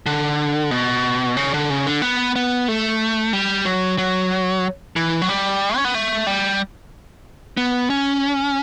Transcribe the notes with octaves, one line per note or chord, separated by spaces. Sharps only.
D3
B2
C#3
D3
C#3
D3
B3
B3
A3
G3
F#3
F#3
E3
F#3
G3
C#4
B3
A3
G3
B3
C#4